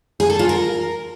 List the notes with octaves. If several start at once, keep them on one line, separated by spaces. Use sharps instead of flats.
G#4
A4
F4
A#4